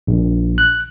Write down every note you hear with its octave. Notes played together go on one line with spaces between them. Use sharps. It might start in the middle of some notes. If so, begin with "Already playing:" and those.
A#1
F#6